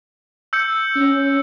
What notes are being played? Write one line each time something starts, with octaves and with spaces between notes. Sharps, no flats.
E6 G6 C#7
C#4